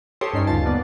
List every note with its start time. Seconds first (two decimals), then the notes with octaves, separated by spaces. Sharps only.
0.21 G4 A4 C#5 D#5 C6
0.33 G2 C#4 D#4 C7
0.47 G1 D2 C#3 F4 A5
0.65 A#3 B3 D5